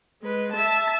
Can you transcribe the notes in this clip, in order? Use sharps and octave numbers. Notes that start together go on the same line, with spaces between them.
G#3 B4
E5 A5